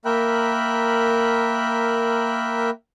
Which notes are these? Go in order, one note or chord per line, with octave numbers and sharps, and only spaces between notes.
A#3 A#4 E5 G5 B5 F#6